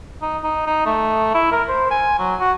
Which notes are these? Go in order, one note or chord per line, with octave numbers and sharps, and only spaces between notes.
D#4
D#4
D#4
A3
E4
A#4
C5
G#5
F#3
F#4